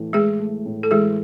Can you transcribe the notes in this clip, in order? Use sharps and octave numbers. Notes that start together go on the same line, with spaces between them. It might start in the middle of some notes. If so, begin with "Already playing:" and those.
Already playing: A2 E3 A3
A2 G#3 G#4
A3
A2
A4
E3 G#3 G#4